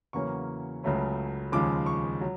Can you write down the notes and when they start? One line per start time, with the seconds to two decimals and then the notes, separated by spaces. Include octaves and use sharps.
0.13 E2 C#3 F#3 A#3 C#4 C#6
0.83 C#2 C#3 F#3 A3 C#4
1.52 D#2 C#3 F3 G#3 D6
1.86 C#6
2.21 F#3